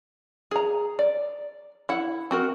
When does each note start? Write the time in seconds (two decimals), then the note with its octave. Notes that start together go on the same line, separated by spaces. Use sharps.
0.51 G#4 A#5
0.99 D5
1.89 E4 F#5
2.31 C4 F#4 A#4